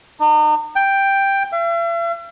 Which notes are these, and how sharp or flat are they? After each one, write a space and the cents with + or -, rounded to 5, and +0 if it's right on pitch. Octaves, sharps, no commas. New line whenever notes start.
D#4 -40
G5 +5
E5 +45